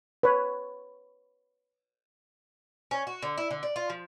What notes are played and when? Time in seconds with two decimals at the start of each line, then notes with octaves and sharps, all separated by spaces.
0.23 B4 C#5
2.91 C#4
3.07 F#4
3.22 D3
3.37 E4
3.51 D3
3.63 D5
3.76 F4
3.90 F3